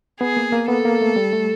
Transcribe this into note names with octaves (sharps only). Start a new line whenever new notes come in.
B3 G#4
A#3
A#3
B3 A4
A#3
A3
G3
A3